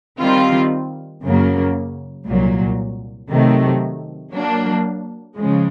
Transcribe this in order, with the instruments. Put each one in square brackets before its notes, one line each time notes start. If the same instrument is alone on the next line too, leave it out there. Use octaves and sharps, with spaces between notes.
[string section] D#3 G3 C4 F4
F#2 C#3 F#3 A#3
C2 A#2 F#3
C3 D#3 F#3 A3
F#3 A#3 D4
C#3 F3 G#3